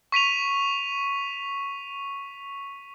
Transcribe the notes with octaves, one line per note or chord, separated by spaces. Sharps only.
C#6 B6 D#7 F7